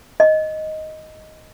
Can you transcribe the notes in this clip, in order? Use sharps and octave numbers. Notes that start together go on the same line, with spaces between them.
D#5